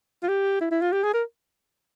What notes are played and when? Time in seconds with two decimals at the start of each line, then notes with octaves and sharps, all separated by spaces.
0.23 F4
0.28 G4
0.61 E4
0.71 E4
0.81 F4
0.92 G4
1.03 G#4
1.13 A#4